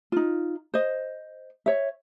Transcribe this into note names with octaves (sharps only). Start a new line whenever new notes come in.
D#4 F4
C5 D#5
C#5 E5